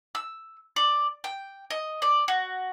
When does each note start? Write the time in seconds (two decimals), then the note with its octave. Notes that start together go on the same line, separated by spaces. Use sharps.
0.15 E6
0.76 D5
1.24 G5
1.70 D#5
2.02 D5
2.28 F#4